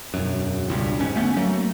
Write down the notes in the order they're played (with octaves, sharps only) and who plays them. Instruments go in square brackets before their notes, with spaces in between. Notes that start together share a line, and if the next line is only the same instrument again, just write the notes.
[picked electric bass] E1 F#2
E1 C#2 G2
G#1 G#2 C#4
G1 A3 B3 C#4
F#3 A3 A#3